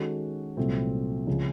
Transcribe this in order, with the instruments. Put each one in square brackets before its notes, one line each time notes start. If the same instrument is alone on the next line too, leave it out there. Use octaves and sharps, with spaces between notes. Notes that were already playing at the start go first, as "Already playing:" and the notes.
Already playing: [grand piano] D#3 G#3 C#4 F#4 A4
C2 A#2 F#3 A3 C4
C#2 C#3 F3